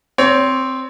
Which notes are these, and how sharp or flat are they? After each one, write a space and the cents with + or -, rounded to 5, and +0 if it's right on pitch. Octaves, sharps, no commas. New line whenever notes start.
C4 +0 C#5 +30